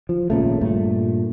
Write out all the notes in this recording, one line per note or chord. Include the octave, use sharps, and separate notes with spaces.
F3
G#1 A#2 C#3 A3
G2 A#2 A3